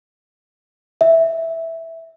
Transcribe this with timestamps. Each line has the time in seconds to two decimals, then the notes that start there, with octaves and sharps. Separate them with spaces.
1.01 E5